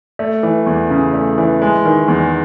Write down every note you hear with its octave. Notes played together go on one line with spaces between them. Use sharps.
A3
E3
E2
C#3
A3
E3
G#3
D#3
E2